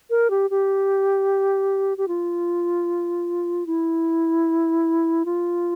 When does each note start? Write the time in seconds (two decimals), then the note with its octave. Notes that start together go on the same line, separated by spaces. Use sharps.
0.10 A#4
0.30 G4
0.50 G4
1.97 G4
2.08 F4
3.66 E4
5.25 F4